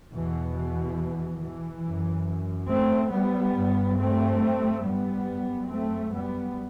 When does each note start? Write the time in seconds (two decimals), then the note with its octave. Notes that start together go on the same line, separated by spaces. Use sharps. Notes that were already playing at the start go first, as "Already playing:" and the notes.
0.12 E2 B2 E3
0.55 E3
1.40 E3
1.83 F#2
2.69 A3 C4
3.13 G3 B3
3.56 G2
3.98 A3 C4
4.84 G3 B3
5.28 F#2
5.71 A3 C4
6.13 G3 B3